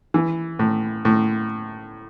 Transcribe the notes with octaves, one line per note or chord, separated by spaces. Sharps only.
E3
A2
A2